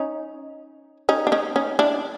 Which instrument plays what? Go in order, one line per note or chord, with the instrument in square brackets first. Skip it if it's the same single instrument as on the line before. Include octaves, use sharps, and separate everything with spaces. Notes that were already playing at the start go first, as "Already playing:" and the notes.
Already playing: [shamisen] C#4 D#4
C#4 D#4
D4
C#4 D#4
C#4 D#4
D4 E4